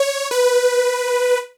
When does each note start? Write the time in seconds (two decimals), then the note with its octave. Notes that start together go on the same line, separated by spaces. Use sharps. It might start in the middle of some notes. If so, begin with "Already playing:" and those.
Already playing: C#5
0.31 B4